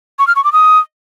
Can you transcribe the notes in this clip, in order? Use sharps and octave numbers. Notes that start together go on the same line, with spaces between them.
C#6
F6
C#6
D6
D#6